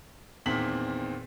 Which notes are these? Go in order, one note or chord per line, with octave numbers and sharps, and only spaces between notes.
E2 A#2 D#3 C4 B6 F#7